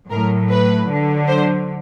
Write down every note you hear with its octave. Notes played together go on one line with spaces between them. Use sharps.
A2 F#3 A#4
B4
D3 F#3
C5